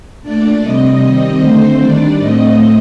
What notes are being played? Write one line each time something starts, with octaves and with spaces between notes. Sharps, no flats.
A#2 A3 D4 D5
C3 G3 C4 D#5
D#3 G3 C4
D3 A3 C4 C5
D#3 G3 D4 D5
A2 A3 C4 D#5